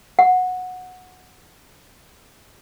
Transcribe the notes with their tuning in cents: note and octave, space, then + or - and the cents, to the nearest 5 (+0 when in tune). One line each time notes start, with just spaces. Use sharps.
F#5 -15